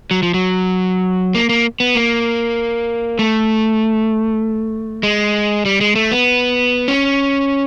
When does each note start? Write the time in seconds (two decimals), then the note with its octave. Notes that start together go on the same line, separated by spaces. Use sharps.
0.11 F#3
0.23 F3
0.34 F#3
1.35 A#3
1.49 A#3
1.80 B3
1.95 A#3
3.19 A3
5.03 G#3
5.65 G3
5.81 G#3
5.95 A3
6.12 B3
6.88 C#4